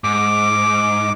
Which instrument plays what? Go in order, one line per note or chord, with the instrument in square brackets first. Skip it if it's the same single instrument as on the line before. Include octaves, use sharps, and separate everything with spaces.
[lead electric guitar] G#2 [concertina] D6